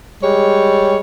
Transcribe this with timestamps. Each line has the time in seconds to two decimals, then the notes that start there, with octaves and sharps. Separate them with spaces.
0.22 G3 G#3 C#5